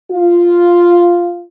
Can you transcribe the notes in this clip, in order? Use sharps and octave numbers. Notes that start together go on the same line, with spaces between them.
F4